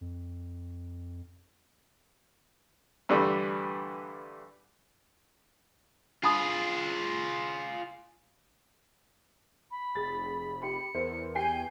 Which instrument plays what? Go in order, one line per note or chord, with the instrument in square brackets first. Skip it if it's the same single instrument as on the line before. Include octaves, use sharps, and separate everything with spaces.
[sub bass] F2
[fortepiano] G2 D3 E3 G3 A3
[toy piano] D4 B5 D#6 [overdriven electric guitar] F4 G#4
[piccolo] B5
[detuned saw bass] F1 [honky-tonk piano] G#4 A6
[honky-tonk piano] G4 B5 [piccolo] C#7
[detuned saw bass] E2 [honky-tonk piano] A#4 C5
[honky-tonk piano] G4 G5 C7 [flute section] G#5 [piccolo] G6